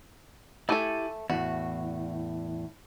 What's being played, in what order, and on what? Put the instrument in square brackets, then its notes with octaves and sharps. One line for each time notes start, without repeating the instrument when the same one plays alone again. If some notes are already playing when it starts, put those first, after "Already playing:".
[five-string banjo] A3 A4 [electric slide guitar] E4 G4 G#5
[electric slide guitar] E2 A2 [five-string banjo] F#4